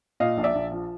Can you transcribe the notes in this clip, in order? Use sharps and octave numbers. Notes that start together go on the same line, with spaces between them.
A#2 D#5 F5
A#1
D5 E5
A#1
F3